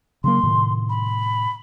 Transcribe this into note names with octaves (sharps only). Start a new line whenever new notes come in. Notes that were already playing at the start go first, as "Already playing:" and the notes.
C#3 F#3 A#3 C6
A2 C3 D#3
B5